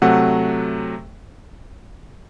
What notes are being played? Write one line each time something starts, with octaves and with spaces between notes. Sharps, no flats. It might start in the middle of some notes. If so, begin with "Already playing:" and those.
C3 F#3 A3 F#5